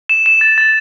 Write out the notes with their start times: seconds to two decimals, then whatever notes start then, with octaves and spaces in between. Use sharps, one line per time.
0.09 E7
0.26 E7
0.41 A6
0.58 A6